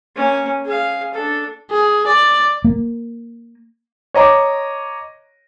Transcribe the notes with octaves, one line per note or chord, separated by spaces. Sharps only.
A#3 C#4
G#4 F5
D4 A4
G#4
D5
A#3
C#5 D#5 A#5 D6